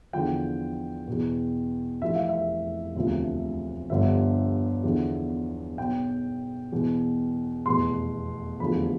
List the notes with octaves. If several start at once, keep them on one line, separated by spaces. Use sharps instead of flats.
E2 D3 F3 G5
E2 B2
F1 F2 E3 E5
F5
E5
E1 D2 C3 F3
G1 G2 D3 F3 E5
E2 D3 F3
B1 B2 G5
E1 E2 B2
F1 E2 B2 C6
F1 E2 D3 F3 B5